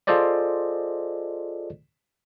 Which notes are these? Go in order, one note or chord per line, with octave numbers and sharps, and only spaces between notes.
F4 G#4 A4 C5 D5 D#5